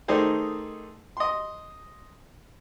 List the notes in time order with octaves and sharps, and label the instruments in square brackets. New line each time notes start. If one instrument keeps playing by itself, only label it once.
[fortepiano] D#3 A3 D#4 G#4 C5 D5
D#5 C6